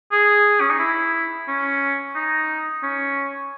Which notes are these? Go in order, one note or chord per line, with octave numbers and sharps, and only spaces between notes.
G#4
C#4
D#4
E4
C#4
D#4
C#4